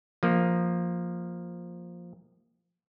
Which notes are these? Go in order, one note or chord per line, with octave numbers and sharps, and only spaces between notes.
F3 A#3